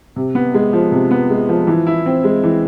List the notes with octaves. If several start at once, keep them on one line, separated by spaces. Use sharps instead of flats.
C3
B3
G#3
F3
C3
B3
G#3
F3
E3
E4
C4
G#3
E3